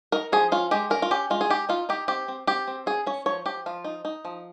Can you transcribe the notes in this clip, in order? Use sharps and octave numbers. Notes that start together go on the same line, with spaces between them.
D#4 A#4
F3 G#4
C#4 F4
G#3 G4
C#4 A#4
F4
C#4 G4
G#3 F4
G#4
D#4 G4
D#4 F4
D#4 G4
C4 G4
C4
C4 G4
C4
C#4 G#4
C#4 C#5
F3 C#5
F3 G4
F3 F4
D#4
D#4
F3